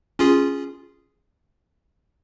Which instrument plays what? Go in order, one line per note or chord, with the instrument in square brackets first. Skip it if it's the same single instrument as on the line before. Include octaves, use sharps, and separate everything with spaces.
[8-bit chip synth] C#4 F4 G#4